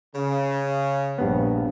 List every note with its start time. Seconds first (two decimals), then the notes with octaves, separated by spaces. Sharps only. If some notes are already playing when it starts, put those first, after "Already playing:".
0.15 C#3
1.18 A#1 G2 B3